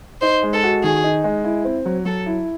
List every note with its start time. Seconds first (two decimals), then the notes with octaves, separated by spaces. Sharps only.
0.21 D#4 C5
0.43 G#3
0.53 A4
0.63 F#4
0.83 D#3 G#4
1.04 D#4
1.24 G#3
1.44 E4
1.65 C4
1.85 F#3
2.05 F#3 A4
2.26 E4